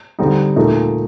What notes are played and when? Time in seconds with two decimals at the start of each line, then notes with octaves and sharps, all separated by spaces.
0.19 D3 G3 C4 D#4
0.56 A#2 A3 D#4